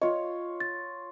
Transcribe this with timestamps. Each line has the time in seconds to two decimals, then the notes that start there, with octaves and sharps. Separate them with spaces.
0.02 F4 C#5 D#5
0.60 A6